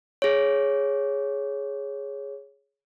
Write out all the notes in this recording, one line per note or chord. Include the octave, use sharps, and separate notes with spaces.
G#4 C#5